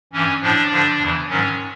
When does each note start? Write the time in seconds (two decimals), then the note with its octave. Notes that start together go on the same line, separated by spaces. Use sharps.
0.13 G2 E3 C#4
0.42 A2 F3 D4
0.70 G2 D3 F3
0.99 E2 C#3 E3
1.28 G#2 D#3 F#3 C#4